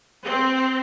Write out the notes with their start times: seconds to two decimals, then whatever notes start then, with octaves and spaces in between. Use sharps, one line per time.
0.24 C4